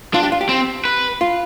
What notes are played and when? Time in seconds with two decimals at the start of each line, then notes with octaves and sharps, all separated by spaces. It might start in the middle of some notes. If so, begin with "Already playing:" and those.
0.14 D4 F4
0.23 G4
0.32 F4
0.41 G4
0.49 C4
0.85 B4
1.21 F4